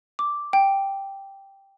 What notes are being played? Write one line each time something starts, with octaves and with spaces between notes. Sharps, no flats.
D6
G5